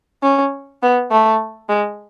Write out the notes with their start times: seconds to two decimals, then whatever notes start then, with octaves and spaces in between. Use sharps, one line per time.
0.23 C#4
0.83 B3
1.12 A3
1.69 G#3